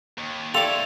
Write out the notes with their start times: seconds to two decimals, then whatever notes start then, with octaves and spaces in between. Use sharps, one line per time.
0.18 D#2
0.54 A4 C#5 D5 E5 F5 G5 C6 F7